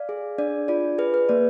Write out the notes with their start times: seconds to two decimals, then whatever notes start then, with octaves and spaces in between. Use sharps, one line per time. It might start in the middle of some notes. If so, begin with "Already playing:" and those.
Already playing: D5 F5
0.09 G#4
0.38 D4 D5
0.68 F4 D5
0.98 G#4 B4
1.14 B4
1.29 A#3 D5